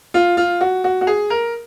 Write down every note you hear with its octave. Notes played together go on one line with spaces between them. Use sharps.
F4
F4
F#4
F#4
F#4
G#4
A#4